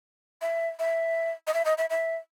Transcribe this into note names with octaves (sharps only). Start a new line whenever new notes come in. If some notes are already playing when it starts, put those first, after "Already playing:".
E5
E5
D#5
E5
D#5
E5
E5